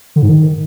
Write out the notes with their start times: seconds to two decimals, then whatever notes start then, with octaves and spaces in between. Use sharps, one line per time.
0.16 D3
0.22 G#2
0.29 D#3